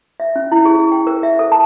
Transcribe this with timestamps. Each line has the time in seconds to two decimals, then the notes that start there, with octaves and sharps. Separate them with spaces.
0.20 E5
0.36 C#4
0.52 E4
0.65 G#4
0.79 G#4
0.92 G5
1.07 A#4
1.23 E5
1.39 A4
1.52 A5